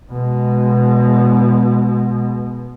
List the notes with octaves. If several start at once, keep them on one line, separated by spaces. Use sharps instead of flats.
B2 G#3